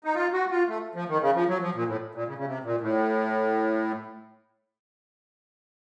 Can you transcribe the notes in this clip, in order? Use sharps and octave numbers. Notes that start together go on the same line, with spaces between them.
D#4
F4
F#4
F4
A3
F3
D#3
C#3
F3
F#3
F3
A#2
A2
A#2
C#3
C#3
C3
A#2
A2